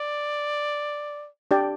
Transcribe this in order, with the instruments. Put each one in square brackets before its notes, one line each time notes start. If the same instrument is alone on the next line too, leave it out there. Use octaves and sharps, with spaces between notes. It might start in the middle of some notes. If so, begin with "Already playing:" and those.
Already playing: [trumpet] D5
[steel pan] D4 G4 D5 G5